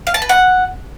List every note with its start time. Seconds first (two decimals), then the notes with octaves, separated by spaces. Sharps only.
0.07 F5
0.14 A5
0.22 B4
0.29 F#5